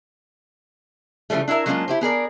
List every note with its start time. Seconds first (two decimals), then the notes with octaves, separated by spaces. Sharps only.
1.30 C#3 E3 F3 G3 A3
1.48 D4 E4 G#4 A#4 E5
1.66 F#3 G#3 A#3 C#4 D4 F4
1.88 E4 G4 C5
2.01 B3 G#4 A#4 D5